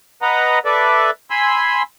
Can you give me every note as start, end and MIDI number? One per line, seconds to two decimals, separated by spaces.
0.22 0.59 71
0.22 0.59 75
0.22 0.59 78
0.22 0.59 82
0.65 1.10 69
0.65 1.10 71
0.65 1.10 74
0.65 1.10 76
1.30 1.82 80
1.30 1.82 83
1.30 1.82 84
1.30 1.82 88